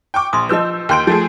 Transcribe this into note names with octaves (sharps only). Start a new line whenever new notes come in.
G5 C#6 D6
A#1 C6 D#6
F3 B4 D#5 E6 G6
D#2 G5 C6 G6 D7
F3 A3 G#4